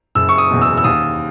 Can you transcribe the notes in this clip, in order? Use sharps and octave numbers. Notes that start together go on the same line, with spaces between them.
F#1 E6
C#6
D#6
E2 B2
E6
E6
D#2 D#6